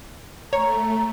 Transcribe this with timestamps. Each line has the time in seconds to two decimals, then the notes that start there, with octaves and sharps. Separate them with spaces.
0.53 A3 C#5 A#5